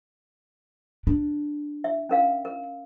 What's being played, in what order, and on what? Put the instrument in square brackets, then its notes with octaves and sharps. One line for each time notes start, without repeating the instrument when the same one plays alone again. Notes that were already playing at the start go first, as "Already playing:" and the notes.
[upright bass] D4
[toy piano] E5
C#4 A#4 F5
A#4